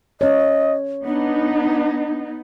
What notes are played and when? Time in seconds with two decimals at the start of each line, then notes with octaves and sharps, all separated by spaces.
0.21 C#4 C#5 D#5
1.05 B3 D4 D#4